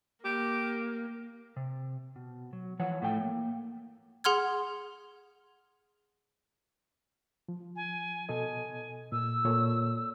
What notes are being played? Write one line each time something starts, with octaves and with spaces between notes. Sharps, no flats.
A#3 G4
C3
B2
F#3
E3 F3 C#5 F#5
A2 A3 G5
A#3
G#4 F#5 C6 F6 G#6
F3
G#5
B2 A4 D#5 G#5
A#2 E6
A#2 A4 C#5